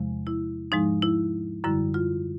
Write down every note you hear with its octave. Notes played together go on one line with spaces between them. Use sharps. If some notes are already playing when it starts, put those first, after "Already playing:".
Already playing: E2 C3 F3 G#3
E4
G#2 F3 G#3 D#4
E4
F#2 D3 G3 E4
F4